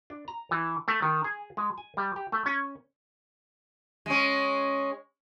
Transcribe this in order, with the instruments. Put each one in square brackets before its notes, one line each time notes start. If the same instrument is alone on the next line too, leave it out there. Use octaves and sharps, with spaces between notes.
[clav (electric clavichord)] D4
A#5
E3
A3
D#3
G#4
G#3
G#5
G3
G4
A3
C#4
[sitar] G#3 C#4